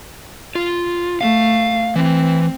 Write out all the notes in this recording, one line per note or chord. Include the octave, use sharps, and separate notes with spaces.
F4
A3 F5
E3 C4